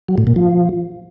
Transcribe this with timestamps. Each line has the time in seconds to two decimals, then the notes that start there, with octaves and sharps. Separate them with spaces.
0.08 F#3
0.18 A2
0.27 A#2
0.36 F3